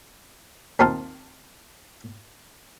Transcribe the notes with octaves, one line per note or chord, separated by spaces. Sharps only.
D#2 C4 D#4 F4 F5 A5